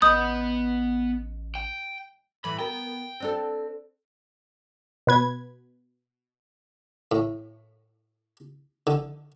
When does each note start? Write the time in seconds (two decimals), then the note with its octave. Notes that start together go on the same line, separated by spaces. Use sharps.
0.02 A1 B3 D#5 B5 D#6 G6
1.55 G5
2.44 A2 E3 B5
2.59 B3 A#4 G5
3.20 C4 D4 A4
5.07 B2 B4 G#6
7.12 A2
8.87 D3